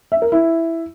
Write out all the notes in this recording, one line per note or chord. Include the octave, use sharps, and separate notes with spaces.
E5
A#4
E4